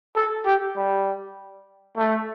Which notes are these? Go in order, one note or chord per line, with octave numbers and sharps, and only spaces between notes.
A4
G4
G3
A3